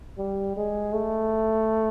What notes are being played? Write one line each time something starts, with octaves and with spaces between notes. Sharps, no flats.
G3
G#3
A3